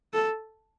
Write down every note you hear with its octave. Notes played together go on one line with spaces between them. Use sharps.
A4